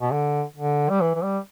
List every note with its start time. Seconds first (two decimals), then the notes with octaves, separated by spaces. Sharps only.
0.02 B2
0.12 D3
0.56 D3
0.90 G3
1.01 E3
1.15 E3
1.23 G3